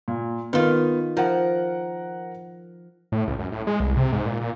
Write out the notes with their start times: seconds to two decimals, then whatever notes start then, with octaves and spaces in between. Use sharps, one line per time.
0.08 A#2
0.53 D#3 B3 F4
1.17 F3 A#4 F#5
3.12 A2
3.27 C#2
3.39 F#2
3.52 A2
3.67 G#3
3.80 C2
3.97 C3
4.12 G#2
4.26 A#2
4.41 A#2